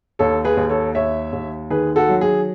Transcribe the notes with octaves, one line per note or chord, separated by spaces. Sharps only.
D#2 A4 C#5
G#4 B4
D#2
A4 C#5
D#2 C#5 E5
D#2
D#3 G#4 B4
F#4 A4
F#3
G#4